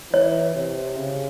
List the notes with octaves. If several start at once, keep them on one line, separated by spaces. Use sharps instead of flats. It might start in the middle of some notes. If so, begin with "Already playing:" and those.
E3 C#5
C3
C#3